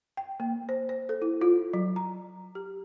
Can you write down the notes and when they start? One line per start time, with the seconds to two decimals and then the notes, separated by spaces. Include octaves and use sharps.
0.17 G5
0.40 A#3
0.69 C5
0.89 C5
1.09 A4
1.22 E4
1.41 F4
1.74 F#3
1.96 A#5
2.55 G4